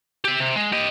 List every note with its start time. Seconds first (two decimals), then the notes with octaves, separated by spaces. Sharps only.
0.24 G4 E5
0.40 C3
0.56 G#3
0.72 G4 D#5